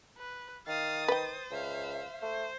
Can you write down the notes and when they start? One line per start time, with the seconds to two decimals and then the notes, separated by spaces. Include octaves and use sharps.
0.18 B4
0.67 D#3 F5 D#6 A6
1.08 B4 C5 G5
1.51 C#2 E5 F5
2.22 A3 C5